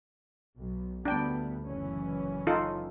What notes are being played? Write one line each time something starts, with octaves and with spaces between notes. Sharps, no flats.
B1
D2 G3 B3 D4 G5
F#1 E3 C#4
D#4 F4 A4